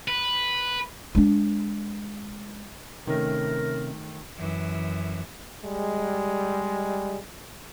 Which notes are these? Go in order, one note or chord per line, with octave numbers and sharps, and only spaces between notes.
B4
G#3 D4
C3 D#3 A3 C#4 A#4
F#2 E3
G3 G#3